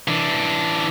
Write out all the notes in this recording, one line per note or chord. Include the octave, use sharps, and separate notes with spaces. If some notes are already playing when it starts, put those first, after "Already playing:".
E3 D4